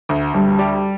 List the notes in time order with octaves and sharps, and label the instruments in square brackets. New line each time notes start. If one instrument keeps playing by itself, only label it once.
[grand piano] D2
[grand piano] D2 [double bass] G3
[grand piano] G3